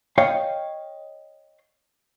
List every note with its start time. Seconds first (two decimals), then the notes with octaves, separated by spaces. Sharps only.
0.18 C#5 D#5 F5 G5